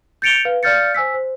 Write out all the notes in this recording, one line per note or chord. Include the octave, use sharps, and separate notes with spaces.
G6 A6 C#7 D7 F7 G7
B4 F5
D5 F5 F6 G6 A6 C#7
C5 G#5 E6 B6
C5